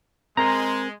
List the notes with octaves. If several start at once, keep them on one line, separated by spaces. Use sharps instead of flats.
G#3 C4 A#4 A#5 C6